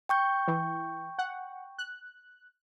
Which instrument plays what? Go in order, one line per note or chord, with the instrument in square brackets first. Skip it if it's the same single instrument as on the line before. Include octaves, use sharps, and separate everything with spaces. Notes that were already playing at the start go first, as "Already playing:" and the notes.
[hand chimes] G5 C#6 G6
[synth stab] E3
F#5
F#6